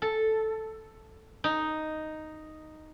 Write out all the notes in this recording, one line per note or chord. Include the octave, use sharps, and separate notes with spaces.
A4
D#4